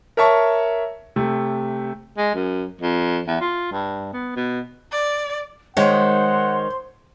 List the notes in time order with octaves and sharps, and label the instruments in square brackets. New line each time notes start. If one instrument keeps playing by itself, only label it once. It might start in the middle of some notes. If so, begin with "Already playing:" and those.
[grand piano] A#4 C#5 E5 A5 C#6
C3 A3
[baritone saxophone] G#3
F#2
F2
E2
F4
G2
B3
B2
[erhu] D5
[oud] D#3 G#3 [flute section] C5 C6 [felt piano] C#5 [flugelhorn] F#5